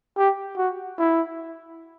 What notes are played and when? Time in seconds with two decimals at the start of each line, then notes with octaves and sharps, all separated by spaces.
0.17 G4
0.57 F#4
0.98 E4